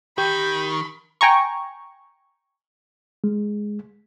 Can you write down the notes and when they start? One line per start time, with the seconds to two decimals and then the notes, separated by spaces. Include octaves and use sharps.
0.18 D#3 G4 B5 G6
1.21 G5 G#5 A#5 C#6
3.24 G#3